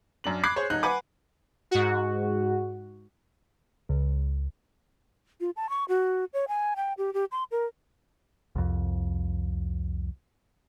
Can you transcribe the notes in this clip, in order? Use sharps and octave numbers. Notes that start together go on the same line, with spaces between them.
F#2 D4 F#7
B5 D6 F#6 G#6 C7
G#4 C5 C#5
D#1 D#4 F#6
B4 F#5 G#5 D6
G#2 F#4
C#2
F4
A5
C#6
F#4
C#5
G#5
G5
G4
G4
C6
A#4
C2 F2